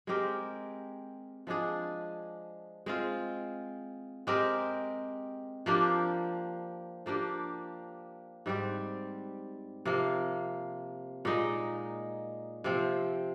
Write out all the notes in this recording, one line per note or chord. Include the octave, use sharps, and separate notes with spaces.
G#3 C4 G4 A#4
F3 G#3 D4 G#4
G#3 C4 F4
G#3 C4 G4 A#4
F3 A#3 D4 G4
F3 A#3 D4 G4
G#2 G3 C4 G4
C3 F3 A#3
A#2 G#3 D#4
C3 F3 C4